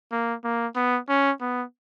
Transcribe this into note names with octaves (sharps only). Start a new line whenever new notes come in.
A#3
A#3
B3
C#4
B3